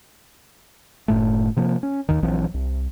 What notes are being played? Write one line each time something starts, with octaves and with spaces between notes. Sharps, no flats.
F#1 A2 A3
C3 F3 A#3
C#4
D#2 D#3
A#1 E3 F#3 C4
C2